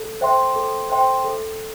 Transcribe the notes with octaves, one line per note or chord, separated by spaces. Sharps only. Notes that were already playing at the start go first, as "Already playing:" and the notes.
Already playing: A4
C5 E5 G5 C6
A4
C5 E5 G5 C6
A4